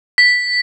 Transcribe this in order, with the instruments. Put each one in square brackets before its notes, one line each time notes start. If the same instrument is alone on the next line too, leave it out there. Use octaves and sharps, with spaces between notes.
[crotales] B6